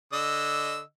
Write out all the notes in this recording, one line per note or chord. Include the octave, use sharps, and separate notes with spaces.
D3 D#5 E6